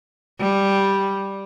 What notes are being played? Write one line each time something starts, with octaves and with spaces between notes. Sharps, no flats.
G3